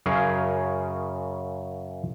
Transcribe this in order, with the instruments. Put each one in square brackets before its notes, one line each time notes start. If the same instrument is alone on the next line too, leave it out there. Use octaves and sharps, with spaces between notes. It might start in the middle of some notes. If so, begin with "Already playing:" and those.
[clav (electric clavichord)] F#2 C#3 C#4 G#4 A#4 F5